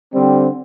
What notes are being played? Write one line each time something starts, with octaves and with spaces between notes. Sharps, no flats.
D3 G3 C4